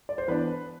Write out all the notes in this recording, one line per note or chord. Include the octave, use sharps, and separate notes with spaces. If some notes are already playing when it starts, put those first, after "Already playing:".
D5
C5
E3 B3 D4 B4